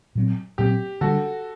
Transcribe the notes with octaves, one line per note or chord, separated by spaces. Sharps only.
A#2 F#3 C4
A#2 F#3 C4 G4
D3 G3 D4 F#4 A4